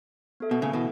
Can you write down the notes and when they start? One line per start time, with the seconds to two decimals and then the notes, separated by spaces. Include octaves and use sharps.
0.40 B3 A4 E5
0.51 B2
0.62 A2 C#3
0.73 B2 E3